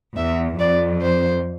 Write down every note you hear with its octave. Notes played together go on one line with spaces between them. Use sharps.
E2 E5
F2 D5
C5